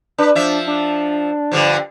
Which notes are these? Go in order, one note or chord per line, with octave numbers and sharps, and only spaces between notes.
D4 B4
F3 D4 E5
D4
G2 D3 F3